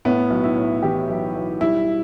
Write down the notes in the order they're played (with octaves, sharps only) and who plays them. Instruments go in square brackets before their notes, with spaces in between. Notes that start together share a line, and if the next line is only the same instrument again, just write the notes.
[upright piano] A2 B3
B1
E4
A2
E3 G4
B1
B1
G3 E4